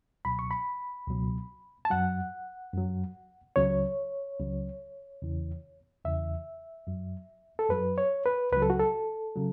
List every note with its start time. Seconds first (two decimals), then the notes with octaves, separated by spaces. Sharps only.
0.25 C#2 B2 F#3 B5
0.39 C#6
0.51 B5
1.08 C#2 B2 F#3
1.85 A5
1.90 F#2 F#3 F#5
2.74 F#2 F#3
3.56 C#2 C#3 F#3 C#5
4.39 C#2 C#3 F#3
5.22 E2 C#3 E3
6.05 E2 C#3 E3 E5
6.87 F#2 F#3
7.59 A4
7.69 F#2 F#3 B4
7.98 C#5
8.26 B4
8.52 C#2 C#3 F#3 B4
8.62 A4
8.70 F#4
8.80 A4
9.35 C#3 F#3